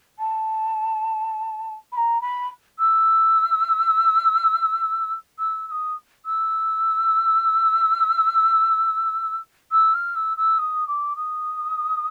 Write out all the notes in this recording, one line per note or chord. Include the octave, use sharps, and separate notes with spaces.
A5
B5
A#5
B5
E6
E6
E6
D#6
E6
E6
F6
E6
E6
D#6
D6
D#6